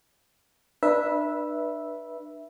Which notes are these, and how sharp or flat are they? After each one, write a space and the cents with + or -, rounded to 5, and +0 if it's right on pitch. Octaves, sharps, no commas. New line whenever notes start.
D4 +35 B4 -20 E5 +0